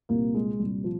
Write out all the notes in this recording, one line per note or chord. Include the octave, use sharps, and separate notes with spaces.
C2 A#2 A#3
G#3
C2 A#2 G3
F3